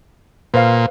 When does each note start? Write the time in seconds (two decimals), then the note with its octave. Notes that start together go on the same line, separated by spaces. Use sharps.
0.54 A#2 B4 C5 F5